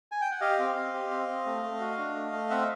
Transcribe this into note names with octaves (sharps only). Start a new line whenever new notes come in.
G#5
G5
F#5
G4 D#5 F5
C4
C4
G4
C4
C4
A3
A3
F#4
D4
A3
A3
C4 E5 F#5